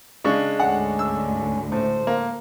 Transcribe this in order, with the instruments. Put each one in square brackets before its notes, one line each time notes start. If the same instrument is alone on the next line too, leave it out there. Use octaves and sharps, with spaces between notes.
[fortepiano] C#3 [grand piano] G#3 D4 C#6
[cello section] D2 G#2 D3 [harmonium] C#4 [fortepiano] F#5
[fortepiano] E6
[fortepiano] A2 [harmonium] C5
[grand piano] A#3